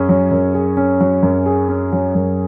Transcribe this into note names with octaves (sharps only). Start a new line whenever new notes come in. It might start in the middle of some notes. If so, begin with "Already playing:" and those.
Already playing: F#2 C#4 G#4
F#3
F#2
G#4
C#4
F#3
F#2
G#4
C#4
F#3
F#2